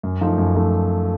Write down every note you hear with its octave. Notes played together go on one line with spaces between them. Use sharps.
F#2
F3 A3 D#4
F#2
F3 A3 D#4